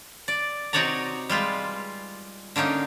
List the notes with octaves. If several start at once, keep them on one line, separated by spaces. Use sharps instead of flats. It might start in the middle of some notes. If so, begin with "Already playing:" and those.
D5
C3 D#4 F#4 C#5 D5 A#5
G3 G#3 F4 B4
D3 A#3 C#4 D#4